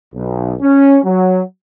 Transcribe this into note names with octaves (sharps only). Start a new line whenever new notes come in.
B1
C#4
F#3